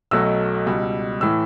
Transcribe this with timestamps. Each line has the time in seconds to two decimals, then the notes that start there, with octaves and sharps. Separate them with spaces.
0.11 B1 B2 F#3 A3 E6
0.66 C#2 B2 G3
1.21 A2 E3 E6